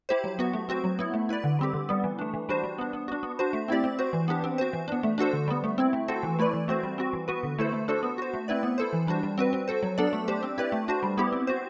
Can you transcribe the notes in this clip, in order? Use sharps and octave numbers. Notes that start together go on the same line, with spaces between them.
E4 G4 C5
F#3
B3 F#4
A3
C4 F#4 C5
F#3
B3 E4
A3
E4 B4 D5
D3
G3 C4 G4
D3
G3 B3
E3
A3 D4
E3
G3 D4 F#4 C5
G3
B3 D4
B3
D4 F#4
B3
D4 F#4 C5
A3
C4 E4 G4 D5
C4
F#4 C5
E3
B3 D4 G4
C4
F#4 C5
E3
B3 D4
A3
D4 F#4 A4 C5
D3
G3 B3
A3
C4 E4
A3
C4 F#4 A4 C5
E3
A3 E4 B4 D5
E3
A3 C4 F#4 C5
G3
C4 F#4
E3
B3 F#4 B4
D3
A3 E4 A4 C5
A3
D4 F#4 A4 C5
B3
F#4 C5
A3
C4 E4 B4 D5
B3
E4 A4 C5
E3
G3 D4 F#4 C5
G3
C4 F#4 B4
C4
F#4 A4 C5
F#3
B3 D4 A4 D5
A3
D4 G4 C5
C4
E4 G4 B4 D5
A3
D4 F#4 C5
G3
B3 E4 G4
C4
F#4 C5